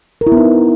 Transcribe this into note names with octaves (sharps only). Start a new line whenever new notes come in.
A#4
E4
B3
D#4